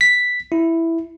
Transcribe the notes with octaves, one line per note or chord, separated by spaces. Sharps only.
B6
E4